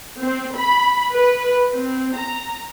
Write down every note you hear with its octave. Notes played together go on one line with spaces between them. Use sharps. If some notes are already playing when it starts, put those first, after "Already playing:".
C4
B5
B4
C4
A#5